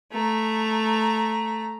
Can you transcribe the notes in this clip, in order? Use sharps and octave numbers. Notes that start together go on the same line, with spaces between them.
A3 A#5